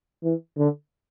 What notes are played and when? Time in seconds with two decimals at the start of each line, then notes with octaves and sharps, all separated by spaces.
0.24 E3
0.57 D3